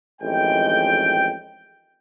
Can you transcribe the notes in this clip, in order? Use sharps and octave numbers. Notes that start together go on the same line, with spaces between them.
A1 F2 D#3 G#3 G5